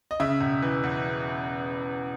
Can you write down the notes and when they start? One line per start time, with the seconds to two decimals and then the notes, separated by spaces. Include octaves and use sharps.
0.11 D#5
0.20 C#3 E5
0.41 E1
0.62 E3
0.83 E2